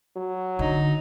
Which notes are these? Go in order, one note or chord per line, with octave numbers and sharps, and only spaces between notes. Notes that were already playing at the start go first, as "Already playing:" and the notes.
F#3
D3 D#4